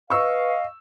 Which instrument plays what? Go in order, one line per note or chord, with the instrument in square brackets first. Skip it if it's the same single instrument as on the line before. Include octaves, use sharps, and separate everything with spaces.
[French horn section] B4 [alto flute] D#5 [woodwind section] F5 [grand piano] C#6 E6